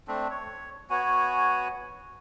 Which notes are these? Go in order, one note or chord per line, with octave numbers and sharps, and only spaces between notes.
A3 C4 D4
C#5
B3 F#4 C#5 G#5